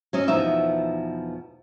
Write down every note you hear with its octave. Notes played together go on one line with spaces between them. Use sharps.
F#3 C#4 D#5
E2 B2 F3 D#4 E5